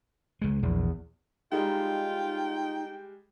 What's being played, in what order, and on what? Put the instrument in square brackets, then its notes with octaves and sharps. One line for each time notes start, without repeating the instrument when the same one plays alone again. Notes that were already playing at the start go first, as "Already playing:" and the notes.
[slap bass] C#2 G#3
[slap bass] A#1 [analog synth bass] E2
[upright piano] G3 G#3 [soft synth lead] D#4 [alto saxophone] F4 [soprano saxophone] G5